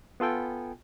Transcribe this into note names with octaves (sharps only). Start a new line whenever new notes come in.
B3 F4 A4 G5 G#5